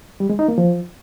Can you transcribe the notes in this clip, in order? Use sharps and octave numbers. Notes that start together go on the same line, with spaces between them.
G3
G#3
D#4
A#3
F3